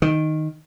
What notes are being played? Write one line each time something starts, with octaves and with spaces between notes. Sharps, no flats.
D#3